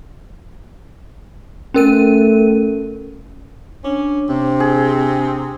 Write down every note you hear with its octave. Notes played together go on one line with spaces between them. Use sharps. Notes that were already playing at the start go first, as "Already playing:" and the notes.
A3 C#4 A#4 D#7
C#4 D4
C3 C4
G#4